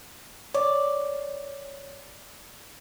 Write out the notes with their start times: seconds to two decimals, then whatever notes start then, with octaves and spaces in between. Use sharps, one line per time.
0.55 C#5 D5